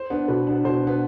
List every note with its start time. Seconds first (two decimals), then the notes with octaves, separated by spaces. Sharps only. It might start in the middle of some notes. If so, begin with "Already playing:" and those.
Already playing: C5
0.10 B3 D4
0.28 B2 B4
0.47 B3 D4
0.64 B2 C5
0.83 B3 D4